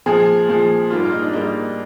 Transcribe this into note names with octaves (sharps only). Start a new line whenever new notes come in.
A#2 F3 G#3 G#4
A#2 F3 G#3
G#2 G3 A#3 F4
F4
D#4
D4
G#2 G3 A#3 D#4